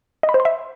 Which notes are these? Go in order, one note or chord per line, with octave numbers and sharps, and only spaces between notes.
D#5
B5
C5
C6
E5